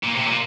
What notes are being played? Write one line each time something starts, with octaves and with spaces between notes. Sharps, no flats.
A#2
C3
A#2